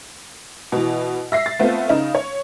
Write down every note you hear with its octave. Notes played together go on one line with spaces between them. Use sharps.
B2 E3
E5 A#6 C7
A6
A3 B3 C4 F4
C#3 D#4
C#5